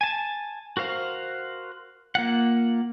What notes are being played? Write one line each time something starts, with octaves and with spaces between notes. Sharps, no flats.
G#5 A5
F#4 A#4 C5 F5
A#3 F4 F#5